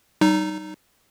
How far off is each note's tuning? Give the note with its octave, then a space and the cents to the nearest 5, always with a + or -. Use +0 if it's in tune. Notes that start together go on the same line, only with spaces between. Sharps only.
G3 -40 D#4 -10